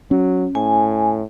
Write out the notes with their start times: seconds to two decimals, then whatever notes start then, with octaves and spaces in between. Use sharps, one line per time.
0.11 F#3 C#4
0.55 A2 G#5